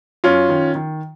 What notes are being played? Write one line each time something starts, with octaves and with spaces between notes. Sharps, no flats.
F#2 C#4 F4
D#3
D#3